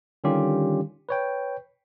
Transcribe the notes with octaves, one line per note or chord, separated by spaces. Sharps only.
D3 D#3 G3 C#4 F4 G4
B4 C#5 G5